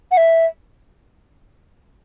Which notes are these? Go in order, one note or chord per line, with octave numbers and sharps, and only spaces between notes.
F#5
E5